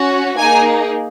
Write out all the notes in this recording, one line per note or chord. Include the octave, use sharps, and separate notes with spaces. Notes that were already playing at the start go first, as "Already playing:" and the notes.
Already playing: C#4 F#4
A#3 D#4 G#4 G#5